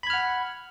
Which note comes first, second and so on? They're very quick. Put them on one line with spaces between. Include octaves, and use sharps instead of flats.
B5 G#6 F6 F#5